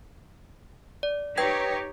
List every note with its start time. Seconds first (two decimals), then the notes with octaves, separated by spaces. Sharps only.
1.03 D5
1.38 D#4 G4 B4 C#5 G5 G#6